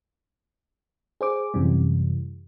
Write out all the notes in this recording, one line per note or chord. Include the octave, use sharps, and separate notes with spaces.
G#4 C5 D6
F#2 C3 E3 G3